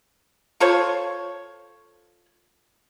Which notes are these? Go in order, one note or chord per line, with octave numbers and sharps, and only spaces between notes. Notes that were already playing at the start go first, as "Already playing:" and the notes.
F4 A4 C5 C#5